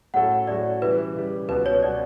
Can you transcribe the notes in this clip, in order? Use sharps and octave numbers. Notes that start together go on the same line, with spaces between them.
A2 F#3 C#4 F#4 A4 F#5
A2 F#3 C#4 F#4 A4 D5
C#3 E3 G3 B4
C#3 E3 G3
C#2 B2 F#3 B4
C#5
B2 F#3 D5